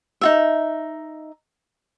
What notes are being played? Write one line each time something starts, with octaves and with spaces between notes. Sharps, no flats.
D#4 F4 E5